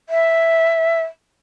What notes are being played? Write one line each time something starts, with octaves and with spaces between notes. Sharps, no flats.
E5